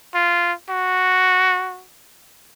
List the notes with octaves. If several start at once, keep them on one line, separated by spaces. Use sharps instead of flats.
F4
F#4